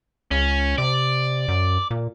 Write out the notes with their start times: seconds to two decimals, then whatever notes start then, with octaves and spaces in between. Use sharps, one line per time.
0.31 C#2 C#4
0.78 C3 D5
1.48 F#2
1.91 A#2